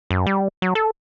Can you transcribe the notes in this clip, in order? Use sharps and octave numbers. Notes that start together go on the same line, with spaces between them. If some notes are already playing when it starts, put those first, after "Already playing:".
F#2
G3
F#3
A4